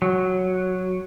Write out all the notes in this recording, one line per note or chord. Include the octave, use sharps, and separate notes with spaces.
F#3